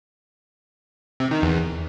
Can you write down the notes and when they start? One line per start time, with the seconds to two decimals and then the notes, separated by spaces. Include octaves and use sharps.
1.20 C3
1.31 D#3
1.42 E2